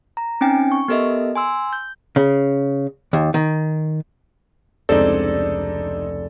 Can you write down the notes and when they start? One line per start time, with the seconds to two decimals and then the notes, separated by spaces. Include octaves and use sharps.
0.17 A#5
0.41 C4 C#4 D#4 G5 G#5
0.72 C#6
0.88 B3 G4 A4 A#4 D#5 E5
1.36 G#5 C6 E6
1.73 G6
2.16 C#3
3.13 D#2
3.34 D#3
4.89 F1 C#2 C4 D4 D#4 A4 D5